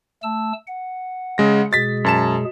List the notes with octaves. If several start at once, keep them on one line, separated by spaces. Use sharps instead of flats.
A3 A5 E6
F#5
C#3 G#3 A#6
B2 G#3 G#4 A6 B6
F#2 A5 E7